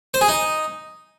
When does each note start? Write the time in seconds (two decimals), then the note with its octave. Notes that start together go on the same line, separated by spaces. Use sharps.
0.14 C5
0.21 G#4
0.28 D#4